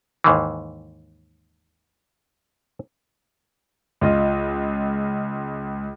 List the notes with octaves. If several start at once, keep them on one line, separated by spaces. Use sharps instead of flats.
D#2 G#2 D#3 E3
C#2 F4 D#5